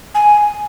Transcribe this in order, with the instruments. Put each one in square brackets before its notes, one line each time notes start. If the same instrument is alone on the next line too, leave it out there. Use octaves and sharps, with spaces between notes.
[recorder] G#5